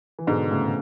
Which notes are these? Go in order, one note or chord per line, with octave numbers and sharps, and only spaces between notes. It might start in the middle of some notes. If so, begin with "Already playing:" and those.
E3
G#2 B2 D3
A2 C#3